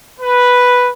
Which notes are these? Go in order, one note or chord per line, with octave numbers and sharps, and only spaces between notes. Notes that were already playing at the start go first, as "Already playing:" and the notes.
B4